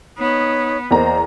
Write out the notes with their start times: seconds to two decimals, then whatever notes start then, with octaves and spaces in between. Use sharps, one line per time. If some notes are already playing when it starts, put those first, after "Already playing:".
0.18 B3 D#4 C#5 D#6
0.91 E2 A#3 C5 D#5 A#5